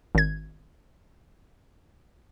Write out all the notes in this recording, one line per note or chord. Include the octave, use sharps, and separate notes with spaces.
G#1 G#6